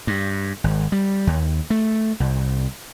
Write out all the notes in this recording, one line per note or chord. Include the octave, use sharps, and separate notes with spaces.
G2
G#1
G3
D#2
A3
C2